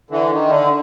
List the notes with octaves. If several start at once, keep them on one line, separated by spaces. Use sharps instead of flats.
D3 E3
D#3
D3